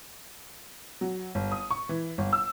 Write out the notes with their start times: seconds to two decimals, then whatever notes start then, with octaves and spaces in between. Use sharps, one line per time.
1.01 F#3
1.35 G1
1.52 D#6
1.71 C#6
1.89 E3
2.18 G1
2.33 E6